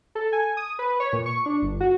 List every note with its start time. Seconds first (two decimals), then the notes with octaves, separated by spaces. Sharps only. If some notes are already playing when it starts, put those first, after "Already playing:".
0.15 A4
0.33 G#5
0.57 D#6
0.79 B4
1.00 C#5
1.13 A#2
1.26 C#6
1.46 D4
1.62 G1
1.80 F#4